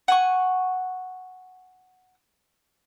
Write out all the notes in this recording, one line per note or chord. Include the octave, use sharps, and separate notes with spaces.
F#5 G#5 C#6